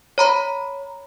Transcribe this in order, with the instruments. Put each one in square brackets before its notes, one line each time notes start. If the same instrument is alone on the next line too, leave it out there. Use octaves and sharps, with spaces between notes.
[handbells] C#5 A#5 B5